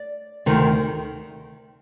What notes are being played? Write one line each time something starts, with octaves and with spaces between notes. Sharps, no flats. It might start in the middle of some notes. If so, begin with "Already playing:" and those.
Already playing: D5
D2 C3 D#3